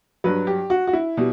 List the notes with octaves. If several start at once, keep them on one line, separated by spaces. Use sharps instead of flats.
G2 F#3 B4
G4
F#4
F#4
E4
B2 G3